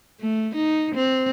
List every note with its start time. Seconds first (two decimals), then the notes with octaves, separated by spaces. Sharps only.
0.21 A3
0.55 D#4
0.95 C4